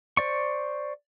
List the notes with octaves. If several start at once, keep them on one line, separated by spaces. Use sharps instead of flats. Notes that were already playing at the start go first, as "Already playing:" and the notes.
C5 D5 C#6